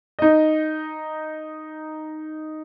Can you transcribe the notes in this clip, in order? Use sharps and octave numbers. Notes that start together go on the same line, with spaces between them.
D#4 D#5